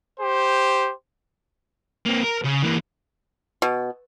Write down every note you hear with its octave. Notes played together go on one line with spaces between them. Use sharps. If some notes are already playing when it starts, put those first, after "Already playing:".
G4 C5
A#3 C4
A#4
C#3
E3 A#3
B2